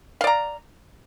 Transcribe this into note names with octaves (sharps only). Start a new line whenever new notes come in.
D5 F5 A#5